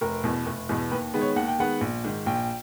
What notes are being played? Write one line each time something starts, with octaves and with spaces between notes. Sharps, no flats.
F1 A#4
E2 B2
F1
E2 B2
D#2 B4
D#3 G#3 B3
C#5
D#2 F#5
G5
D#3 G#3 B3 F#5
A#1
G#2 D#3
A#1 G5